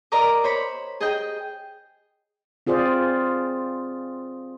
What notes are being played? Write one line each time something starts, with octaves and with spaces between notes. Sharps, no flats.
A#4 D5 D#5 A#5 D6
C5 C#5 B5
G#4 D#5 G5
C4 F4 G#4 C5 D5